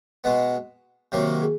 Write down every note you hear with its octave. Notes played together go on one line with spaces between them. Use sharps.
B2 G#3 B3 D#5
C3 D#3 F#3 A#3 C#5
G#4